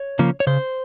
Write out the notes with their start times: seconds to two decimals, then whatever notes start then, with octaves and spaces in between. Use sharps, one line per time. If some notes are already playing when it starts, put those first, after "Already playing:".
Already playing: C#5
0.19 C#3 F3 A#3 C#4
0.40 C#5
0.47 C#3 C5